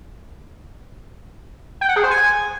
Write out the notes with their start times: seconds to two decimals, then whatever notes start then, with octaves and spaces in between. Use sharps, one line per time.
1.81 G5
1.89 F#5
1.96 G#4
2.04 C5
2.11 G#5